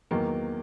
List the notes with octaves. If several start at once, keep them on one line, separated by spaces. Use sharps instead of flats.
E2 D#3 F#3 A#3